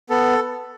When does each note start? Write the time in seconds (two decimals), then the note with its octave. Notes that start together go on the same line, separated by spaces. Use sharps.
0.10 B3 A4